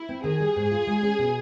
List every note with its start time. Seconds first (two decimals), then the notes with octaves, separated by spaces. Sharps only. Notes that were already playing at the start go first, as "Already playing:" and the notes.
Already playing: E4
0.09 C4
0.24 D#3 G#4
0.40 G3
0.56 G#2
0.71 F4
0.87 G#3
1.03 C#4
1.19 B2